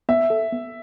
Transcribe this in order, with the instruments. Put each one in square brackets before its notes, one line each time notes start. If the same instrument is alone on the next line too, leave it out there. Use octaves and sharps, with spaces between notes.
[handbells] B3 [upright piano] E5
[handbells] A4
B3